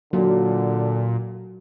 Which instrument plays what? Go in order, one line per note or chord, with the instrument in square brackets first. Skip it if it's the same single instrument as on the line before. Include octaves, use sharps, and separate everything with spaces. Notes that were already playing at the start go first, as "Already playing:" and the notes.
[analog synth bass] A#2 [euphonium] D3 [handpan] F#3